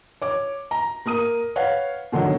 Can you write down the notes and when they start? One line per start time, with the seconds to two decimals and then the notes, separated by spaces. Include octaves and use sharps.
0.22 C#5 D6
0.71 A#5
1.06 A#3 A#4 D#6 D#7
1.56 B4 C#5 F5 F#5
2.12 B2 D3 D#3 F#3